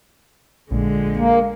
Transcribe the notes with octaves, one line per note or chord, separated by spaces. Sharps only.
A#1 D3 G#3
A#3